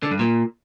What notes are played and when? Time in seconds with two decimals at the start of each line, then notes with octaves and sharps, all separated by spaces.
0.03 D3
0.11 G2
0.19 A#2